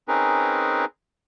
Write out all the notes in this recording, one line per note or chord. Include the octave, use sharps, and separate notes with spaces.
C4 C#4 D#4 G#4 A#4 B4